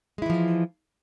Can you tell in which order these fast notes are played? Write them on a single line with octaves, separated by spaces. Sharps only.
G#3 E4 E3 F3